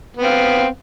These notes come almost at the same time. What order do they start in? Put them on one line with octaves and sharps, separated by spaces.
B3 C4 F5